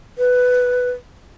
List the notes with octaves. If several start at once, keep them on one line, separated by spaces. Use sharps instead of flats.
B4